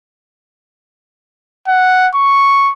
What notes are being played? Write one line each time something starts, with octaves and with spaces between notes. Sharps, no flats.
F#5
C#6